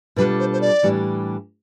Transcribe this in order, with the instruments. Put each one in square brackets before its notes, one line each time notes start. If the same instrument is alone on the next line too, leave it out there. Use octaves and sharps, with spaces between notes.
[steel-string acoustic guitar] B2 G3 D4 F4 A4 [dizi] B4
[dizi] C5
C5
D5
[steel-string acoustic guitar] A2 E3 G3 D4 G4